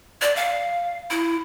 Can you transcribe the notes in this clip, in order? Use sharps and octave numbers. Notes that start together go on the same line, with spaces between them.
D5
F5
E4